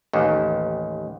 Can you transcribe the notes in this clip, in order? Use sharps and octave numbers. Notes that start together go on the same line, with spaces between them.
A1 D#2